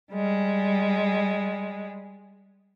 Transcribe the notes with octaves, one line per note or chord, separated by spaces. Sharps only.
G3 G#3